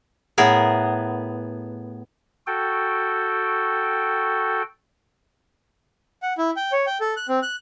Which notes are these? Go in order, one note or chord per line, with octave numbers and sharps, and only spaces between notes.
A2 B3 G#4 A#4
F#4 A4 G5
F#5
E4
G5
C#5
G5
A4
F#6
C4
F#6